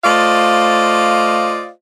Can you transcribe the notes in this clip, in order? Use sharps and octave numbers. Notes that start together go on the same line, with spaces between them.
A3 F4 C5 D5 D#5 F5